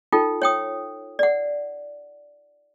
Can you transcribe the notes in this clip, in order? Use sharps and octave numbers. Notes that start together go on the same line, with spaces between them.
D#4 F4 A4 G5
C#5 G5 D#6
D5 F#5